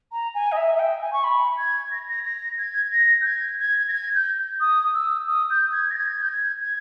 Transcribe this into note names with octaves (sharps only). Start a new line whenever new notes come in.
A#5
G#5
D#5
E5
E5
G5
G#5
C#6
B5
G#6
A#6
A#6
A#6
G#6
A#6
G6
G#6
G#6
A#6
G#6
G6
D#6
E6
D#6
G6
G#6
A#6
G#6
G6
G#6
G#6